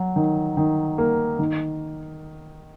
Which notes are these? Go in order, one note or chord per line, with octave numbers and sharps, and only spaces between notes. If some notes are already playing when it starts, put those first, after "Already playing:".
Already playing: F#3
D#3
D#3
A#3
D#3